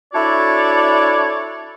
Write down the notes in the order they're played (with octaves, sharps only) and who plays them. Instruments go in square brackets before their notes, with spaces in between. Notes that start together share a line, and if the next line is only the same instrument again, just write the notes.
[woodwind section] D4 E4 F#4 A4 C#5 D5